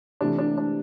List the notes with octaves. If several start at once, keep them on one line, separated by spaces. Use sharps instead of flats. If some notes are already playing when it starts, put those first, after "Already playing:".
C3 E3 A3 D4
D4
D4